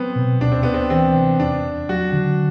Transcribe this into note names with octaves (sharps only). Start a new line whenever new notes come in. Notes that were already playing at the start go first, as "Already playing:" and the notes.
Already playing: F#3 B3 C4
B2
D2 D4
C4
D2 B3
C4
E3 C4
C3
E2 D4
E2
F#3 F#4
D3